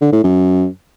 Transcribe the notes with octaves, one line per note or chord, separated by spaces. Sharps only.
D3
A2
F#2